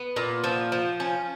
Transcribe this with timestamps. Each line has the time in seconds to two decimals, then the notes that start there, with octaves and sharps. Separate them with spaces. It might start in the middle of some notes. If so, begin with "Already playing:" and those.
Already playing: B3
0.16 A#2
0.44 F3
0.72 F3
1.00 C#4